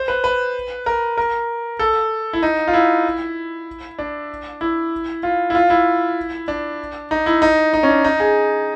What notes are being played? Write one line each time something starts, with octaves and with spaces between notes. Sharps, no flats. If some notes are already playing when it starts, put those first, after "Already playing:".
Already playing: C5
B4
B4
A#4
A#4
A4
E4
D#4
F4
E4
D4
E4
F4
E4
F4
E4
D4
D#4
E4
D#4
D#4
C#4
D4
D#4
G#4